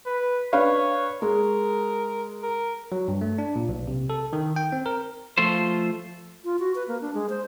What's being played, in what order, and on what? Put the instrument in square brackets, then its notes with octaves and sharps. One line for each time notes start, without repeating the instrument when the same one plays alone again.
[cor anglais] B4
[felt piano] D4 B4 F5 [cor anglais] C#5
[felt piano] G#3 [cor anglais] A#4
[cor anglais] A#4
[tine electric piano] F#3
G2
A3
D4
A#2
B1
C3
A4
D#3
G5
C4
A#4
[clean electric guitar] F3 A3 F4 C5
[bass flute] F4
F#4
B4
A#3
D4
G#3
C5